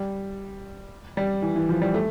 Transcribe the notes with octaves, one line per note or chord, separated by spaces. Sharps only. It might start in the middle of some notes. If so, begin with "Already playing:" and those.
Already playing: G3
G3
E3
E3
F3
G3
A3